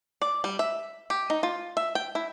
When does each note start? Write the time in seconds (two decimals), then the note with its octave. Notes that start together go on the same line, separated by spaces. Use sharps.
0.22 D5
0.44 G3
0.59 E5
1.10 G4
1.30 D#4
1.43 F4
1.77 E5
1.95 G5
2.15 E4